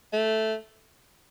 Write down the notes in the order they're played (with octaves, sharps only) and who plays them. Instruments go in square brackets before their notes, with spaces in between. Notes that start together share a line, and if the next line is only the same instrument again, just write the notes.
[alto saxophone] A3